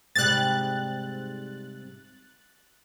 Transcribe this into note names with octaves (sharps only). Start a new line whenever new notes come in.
G#2 C3 G3 F#6 A6